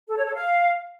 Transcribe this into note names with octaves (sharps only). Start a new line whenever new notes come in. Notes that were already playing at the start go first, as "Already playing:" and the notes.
A4
C#5
A4
F5